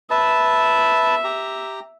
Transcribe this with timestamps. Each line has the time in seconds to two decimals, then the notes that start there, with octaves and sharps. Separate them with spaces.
0.10 B4 E5 A5
1.24 G4 A#5